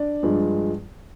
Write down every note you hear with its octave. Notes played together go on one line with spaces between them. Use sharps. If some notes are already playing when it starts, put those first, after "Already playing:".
Already playing: D4 D5
G2 F3 G#3